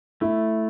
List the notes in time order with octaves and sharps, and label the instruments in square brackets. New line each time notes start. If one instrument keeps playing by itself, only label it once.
[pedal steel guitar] A3 [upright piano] E4